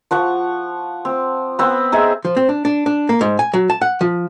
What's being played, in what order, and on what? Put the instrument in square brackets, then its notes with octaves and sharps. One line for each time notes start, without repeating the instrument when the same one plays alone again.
[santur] F3 F#5 C#6
C4
B3 C4 B5
D#4 G#4 E5
[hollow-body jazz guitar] F3
C4
D4
D4
D4
A#3
G#2
G#5
F#3
A5
F#5
F3